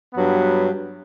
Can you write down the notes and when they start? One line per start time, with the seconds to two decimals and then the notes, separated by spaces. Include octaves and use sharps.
0.12 G2 F#3 B3